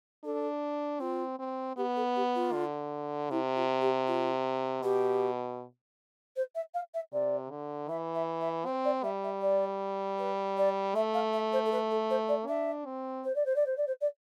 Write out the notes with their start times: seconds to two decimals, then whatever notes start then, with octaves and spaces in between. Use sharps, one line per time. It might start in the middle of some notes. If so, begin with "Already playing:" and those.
0.24 D4 A4
1.00 C4 F4
1.39 C4
1.76 B3 G4
1.96 A4
2.15 G4
2.35 F4
2.53 D3
3.30 C3 E4
3.56 F4
3.81 G4
4.07 F4
4.83 B2 G4
6.36 C5
6.55 E5
6.74 F5
6.94 E5
7.13 C3 D5
7.51 D3
7.89 E3 E5
8.14 E5
8.40 E5
8.66 C4 C5
8.84 D5
9.03 G3 E5
9.23 E5
9.41 D5
10.19 B4
10.57 D5
10.95 A3 E5
11.14 F5
11.33 E5
11.52 C5
11.65 A4
11.71 B4
11.90 A4
12.10 C5
12.28 D5
12.47 D4 E5
12.86 C4
13.24 C5
13.35 D5
13.45 C5
13.55 D5
13.66 C5
13.77 D5
13.87 C5
14.01 D5